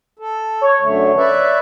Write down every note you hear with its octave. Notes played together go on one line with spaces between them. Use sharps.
A4
C#5
F#2 D3 A3
B4 D5 E5